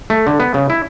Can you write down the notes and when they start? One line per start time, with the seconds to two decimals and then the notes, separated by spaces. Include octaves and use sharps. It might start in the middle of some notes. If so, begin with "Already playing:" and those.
0.10 A3
0.27 D3
0.40 B3
0.54 C#3
0.70 E4